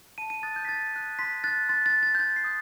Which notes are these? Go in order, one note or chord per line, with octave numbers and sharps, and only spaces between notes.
A5 D#7
D#7
D#6 F#6 A6
G6
B6
A5 A6
D#6 F#6
C6 B6
F#6 A6
C6 A6
A6
F#6
A6
G6
C6 A6
C7
D#6 G6